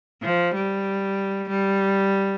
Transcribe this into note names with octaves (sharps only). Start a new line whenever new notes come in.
F3
G3
G3